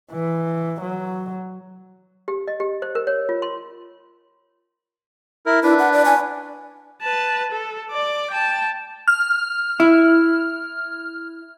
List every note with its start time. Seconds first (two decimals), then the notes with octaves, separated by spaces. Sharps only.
0.11 E3
0.81 F#3
2.28 G4
2.48 D#5
2.60 G4
2.82 C5
2.95 A#4
3.07 C#5
3.29 F4
3.42 C6
5.46 E4 A#4
5.63 D4 E4 B4
5.79 F#5
5.93 D5
6.05 G#5
7.02 B4 A5
7.51 A4
7.91 D5 D6
8.30 G5 A5
9.08 F6
9.80 E4